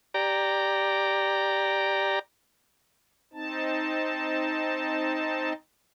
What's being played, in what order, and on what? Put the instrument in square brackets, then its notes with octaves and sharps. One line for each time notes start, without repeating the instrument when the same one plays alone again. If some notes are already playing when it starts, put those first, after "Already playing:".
[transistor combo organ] G4 D5 A#5
[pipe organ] C4 D#4 A5